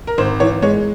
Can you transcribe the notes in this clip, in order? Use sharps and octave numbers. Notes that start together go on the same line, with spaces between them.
A#4
G#1 C5
E3 C#5
G#3 C#5